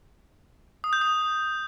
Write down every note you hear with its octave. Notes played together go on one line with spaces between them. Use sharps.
D#6
G6
D#6